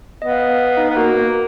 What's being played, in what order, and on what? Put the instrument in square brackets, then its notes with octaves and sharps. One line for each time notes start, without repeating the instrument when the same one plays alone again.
[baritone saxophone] B3 [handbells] D#5
[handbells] F5
D#5
F5
D#5
F5
D#4 D#5
[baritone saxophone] B3
[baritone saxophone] A#3 [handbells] F#4 F#5